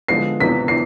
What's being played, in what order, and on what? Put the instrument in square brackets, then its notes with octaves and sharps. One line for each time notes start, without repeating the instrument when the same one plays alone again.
[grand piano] D3 F3 G#3 B3 F4 [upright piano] C7
[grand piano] C3 F3 B3 [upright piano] B6
[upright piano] C7